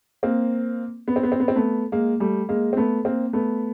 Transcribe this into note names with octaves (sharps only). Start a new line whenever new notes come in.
A#3 C4
B3
C4
B3
C4
B3
C4
A3 B3
G#3 A#3
G3 A3
G#3 A#3
C4
A3 B3
A#3 C4
A3 B3